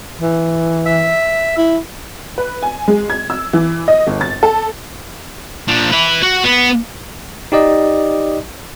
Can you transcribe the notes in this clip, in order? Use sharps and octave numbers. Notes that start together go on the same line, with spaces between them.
E3
E5
E4
B4
G#5
G#3
G#6
E6
E3
D#5
G1
A6
A4
A#2 D4
B4 E5
F#4
B3
D#4 G4 D5 D#5